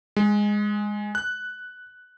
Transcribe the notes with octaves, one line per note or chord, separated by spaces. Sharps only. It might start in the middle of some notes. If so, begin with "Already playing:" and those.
G#3
F#6